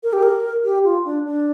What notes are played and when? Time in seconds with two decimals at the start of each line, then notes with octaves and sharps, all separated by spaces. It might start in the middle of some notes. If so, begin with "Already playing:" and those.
0.03 A#4
0.13 G4
0.23 A#4
0.65 G4
0.84 F4
1.05 D4
1.26 D4